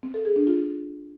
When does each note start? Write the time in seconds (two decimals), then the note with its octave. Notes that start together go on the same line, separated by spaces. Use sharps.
0.03 C4
0.14 A4
0.25 G#4
0.36 D4
0.47 F4